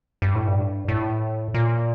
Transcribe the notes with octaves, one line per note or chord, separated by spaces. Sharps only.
G2
A2
G2
A2
A#2